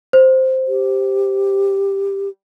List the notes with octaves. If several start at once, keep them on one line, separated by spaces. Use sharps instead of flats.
C5
G4